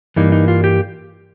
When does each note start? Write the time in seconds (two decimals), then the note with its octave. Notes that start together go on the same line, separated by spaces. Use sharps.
0.16 G2 E3 G3 A#3 D#4
0.32 D#4
0.48 F4
0.64 G4